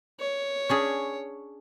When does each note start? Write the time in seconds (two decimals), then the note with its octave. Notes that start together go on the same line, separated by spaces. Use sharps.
0.20 C#5
0.69 C#4 D4 G#4